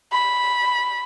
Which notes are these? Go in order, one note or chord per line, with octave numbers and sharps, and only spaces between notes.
B5